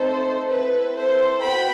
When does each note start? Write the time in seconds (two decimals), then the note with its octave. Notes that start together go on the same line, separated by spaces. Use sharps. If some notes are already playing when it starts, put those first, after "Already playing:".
Already playing: A3 C4 D#4 A4 C5
0.48 C4 E4 A4 B4
0.95 A4 C5
1.42 B3 F#4 G5 B5